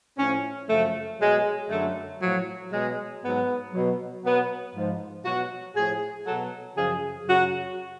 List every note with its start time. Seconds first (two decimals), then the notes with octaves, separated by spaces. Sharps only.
0.17 A2 F3 C#4
0.68 F#2 C#3 F3 A3
1.19 B2 F#3 G#3
1.69 F#2 D3 F#3 A3
2.20 A2 F3 F#3
2.72 B2 F#3 G#3
3.22 G#2 F#3 B3
3.72 B2 F#3
4.23 B2 F#3 B3
4.74 G#2 F3
5.24 B2 F#3 F#4
5.75 A2 F3 G#4
6.26 B2 F#3 A4
6.76 F#2 C#3 F3 G#4
7.27 F#2 C#3 F#3 F#4